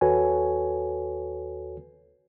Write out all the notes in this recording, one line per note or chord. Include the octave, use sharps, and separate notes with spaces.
D#2 F#4 A4 B4 C#5 G#5